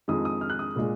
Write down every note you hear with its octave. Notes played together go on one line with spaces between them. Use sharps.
F2 D#3 G#3 D#6
D#6
F6
F#6
D#6
A#2 G#3